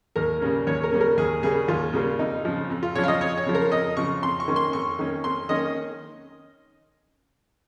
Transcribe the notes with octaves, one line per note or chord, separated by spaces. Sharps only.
D#2 A#4
C#3 G3 A#3 C#4
D#2 C#5
A#4
C#3 G3 A#3 C#4
A#4
D#2 G#4
C#3 G3 A#3 C#4 G#4
D#2 F4
C#3 G3 A#3 C#4
F2 D#4
C#3 F3
F2
F4
C#3 F3 C#5
F5
D#5
F2 C#5
C#5
C#3 F3
A#4
F2 D#5
C#3 F3 C#6
F2 C6
C#6
D#3 A#3 C#4
C6
F2 C#6
D#3 A#3 C#4
F2 C6
D#3 A#3 C#4 D#5